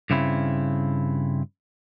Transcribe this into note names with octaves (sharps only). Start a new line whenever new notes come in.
G2 C#3 C4 E4